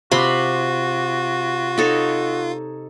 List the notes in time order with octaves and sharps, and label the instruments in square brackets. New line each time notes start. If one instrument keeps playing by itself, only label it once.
[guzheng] C3 [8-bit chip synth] F4 [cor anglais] F#4 [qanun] B5 C6
[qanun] D#4 A4 C#5